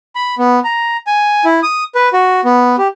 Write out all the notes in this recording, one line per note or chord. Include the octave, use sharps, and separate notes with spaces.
B5
B3
A#5
G#5
E4
D#6
B4
F#4
B3
G4